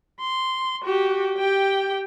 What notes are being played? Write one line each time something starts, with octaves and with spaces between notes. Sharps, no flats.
C6
F#4 G4
G4 G5